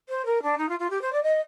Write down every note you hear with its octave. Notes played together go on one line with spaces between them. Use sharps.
C5
A#4
D4
D#4
F4
F4
G4
C5
D5
D#5